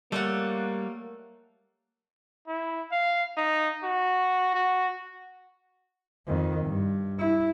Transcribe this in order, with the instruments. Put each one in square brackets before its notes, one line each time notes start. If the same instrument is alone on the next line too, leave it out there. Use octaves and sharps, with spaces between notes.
[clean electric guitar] G3 [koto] A3 C#5 F#5 [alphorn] A#3
[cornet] E4
F5
D#4
F#4
F#4
[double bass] F2 D#3
G2
E4